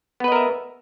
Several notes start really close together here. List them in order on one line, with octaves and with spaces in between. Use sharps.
B3 B4 D#5 A#4 E5